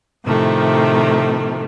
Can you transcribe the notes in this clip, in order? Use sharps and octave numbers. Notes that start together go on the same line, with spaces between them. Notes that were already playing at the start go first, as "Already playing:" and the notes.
A2 C3 D#3 F3 A3